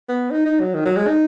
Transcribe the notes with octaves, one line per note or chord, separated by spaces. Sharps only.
B3
D#4
D#4
F#3
D#3
F#3
G#3
D#4